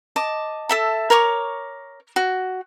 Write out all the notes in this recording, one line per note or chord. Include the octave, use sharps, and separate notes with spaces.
D#5 A5 D6
A4 E5 A5
A#4 C#5 C#6 D6
F#4